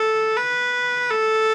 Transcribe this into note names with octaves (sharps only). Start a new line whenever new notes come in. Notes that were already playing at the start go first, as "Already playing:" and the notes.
Already playing: A4
B4
A4